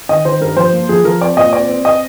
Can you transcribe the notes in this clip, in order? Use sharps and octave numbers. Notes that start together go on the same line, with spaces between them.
D#3 D#5
D#3 C5
G2 A#4
F3 C5
A#3
F3 G#4
F3 A#4
C4 D5
A#2 D#5
C4 D5
C4
D#5